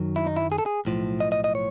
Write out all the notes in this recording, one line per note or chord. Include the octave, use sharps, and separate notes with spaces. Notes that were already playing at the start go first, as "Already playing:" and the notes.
Already playing: F#2 D#3 F#3
E4
D#4
E4
G#4
A4
G#4
B1 A2 F3
D#5
D#5
D#5
C#5